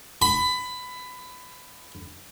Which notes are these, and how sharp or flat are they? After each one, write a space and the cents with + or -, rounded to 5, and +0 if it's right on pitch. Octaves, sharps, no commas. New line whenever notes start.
B5 +20